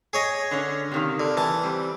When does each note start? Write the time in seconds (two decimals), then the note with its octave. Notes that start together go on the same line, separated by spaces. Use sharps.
0.13 G#4 C#5 D#5
0.51 D3 C#4
0.92 C3 D#3 A#3
1.20 D3
1.37 E3 A5
1.63 G3 C4